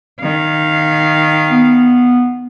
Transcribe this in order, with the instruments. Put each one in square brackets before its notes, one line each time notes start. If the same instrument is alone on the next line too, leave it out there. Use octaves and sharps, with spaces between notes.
[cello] D#3 F5
[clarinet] B3